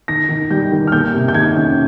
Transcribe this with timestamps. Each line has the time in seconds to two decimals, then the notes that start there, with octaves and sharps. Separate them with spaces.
0.08 D#3 A#6
0.29 D#3
0.50 G3 G6
0.72 D#3
0.87 F6
0.92 A#3 G6
1.13 C3
1.28 G6
1.34 D#3 G#6
1.55 C#4